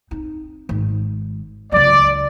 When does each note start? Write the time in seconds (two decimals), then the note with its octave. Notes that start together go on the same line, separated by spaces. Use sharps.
0.11 C4 D#4
0.69 G#1
1.72 C#2 F#3 D5